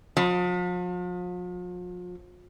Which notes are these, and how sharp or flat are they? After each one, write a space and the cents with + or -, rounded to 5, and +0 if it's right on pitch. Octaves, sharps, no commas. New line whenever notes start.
F3 +40